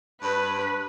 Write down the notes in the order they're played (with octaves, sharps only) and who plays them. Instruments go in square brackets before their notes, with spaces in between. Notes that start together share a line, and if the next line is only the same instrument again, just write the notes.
[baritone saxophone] G2 [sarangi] B4